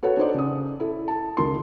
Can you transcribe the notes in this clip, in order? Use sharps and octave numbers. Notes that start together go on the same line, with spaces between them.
F#4 A4 B4 C#5 F#5
D4 D#4 C5 D5
C#3 D#6
E4 A4
A5
C#2 D#3 A#4 C6